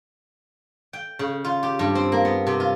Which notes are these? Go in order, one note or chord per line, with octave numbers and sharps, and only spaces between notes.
G5
C#3
F4
G4
G2
C4
A#3
B3
C3
F4